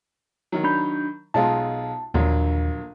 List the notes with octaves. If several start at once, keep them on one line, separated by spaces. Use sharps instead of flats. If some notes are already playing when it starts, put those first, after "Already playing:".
D#3 F#3
D4 B5 G6
B1 G#3 F4 A5
A#1 D#2 D3 F#3